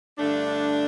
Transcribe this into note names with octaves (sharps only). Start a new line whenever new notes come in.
G2 D3 A3 D4